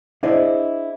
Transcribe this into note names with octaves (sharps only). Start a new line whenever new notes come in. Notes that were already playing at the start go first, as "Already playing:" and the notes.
D4 E4 G#4 C5 D5 D#5